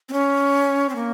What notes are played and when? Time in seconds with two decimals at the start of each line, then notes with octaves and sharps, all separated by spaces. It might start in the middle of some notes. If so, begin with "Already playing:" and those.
0.09 C4
0.13 C#4
0.89 C4
0.95 A#3